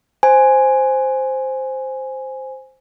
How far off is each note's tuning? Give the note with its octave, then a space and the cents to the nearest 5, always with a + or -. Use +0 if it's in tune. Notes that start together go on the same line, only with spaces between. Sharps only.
C5 +0 G#5 +0